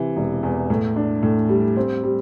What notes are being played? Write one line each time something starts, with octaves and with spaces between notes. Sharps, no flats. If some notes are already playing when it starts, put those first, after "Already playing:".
Already playing: C3 E3
E1
E2
A2
D4
A2
G3
C4
G3